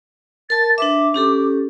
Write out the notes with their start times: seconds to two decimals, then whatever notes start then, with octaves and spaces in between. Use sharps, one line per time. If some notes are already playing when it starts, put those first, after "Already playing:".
0.50 A#4 A5 A6
0.78 D4 B4 E5 D6
1.14 C#4 G4 A4